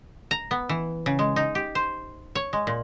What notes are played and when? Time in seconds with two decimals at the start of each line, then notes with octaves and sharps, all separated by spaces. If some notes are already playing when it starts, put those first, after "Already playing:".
0.31 A#5
0.51 B3
0.69 E3
1.06 C#3
1.19 G#3
1.36 D#4
1.55 G4
1.75 C5
2.35 C#5
2.53 G#3
2.67 A#2